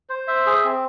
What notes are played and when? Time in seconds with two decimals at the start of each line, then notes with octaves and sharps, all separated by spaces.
0.10 C5
0.28 E5
0.46 G#4
0.64 C4